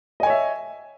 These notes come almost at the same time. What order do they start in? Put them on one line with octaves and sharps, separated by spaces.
D#5 G#5 C#5 E5